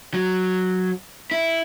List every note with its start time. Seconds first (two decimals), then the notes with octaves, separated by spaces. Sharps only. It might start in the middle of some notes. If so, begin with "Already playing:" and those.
0.14 F#3
1.31 E4